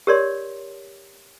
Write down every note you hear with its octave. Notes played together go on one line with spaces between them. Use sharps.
G4 A#4 C#5 D5 C6